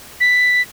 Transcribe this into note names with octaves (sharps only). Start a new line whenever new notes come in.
B6